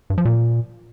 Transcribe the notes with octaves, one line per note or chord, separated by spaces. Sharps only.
G2
F3
A#2